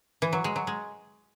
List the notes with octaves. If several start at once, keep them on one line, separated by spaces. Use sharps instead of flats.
E3
F#3
G#3
F#3
G#3